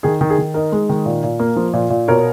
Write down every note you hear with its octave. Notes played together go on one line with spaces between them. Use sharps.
D#3 G#4
D#3
G#4
D#3
D#4 A#4
G#3
D#3
A#2
A#2
A#3
F3
A#2
A#2
B2 A#4 C#5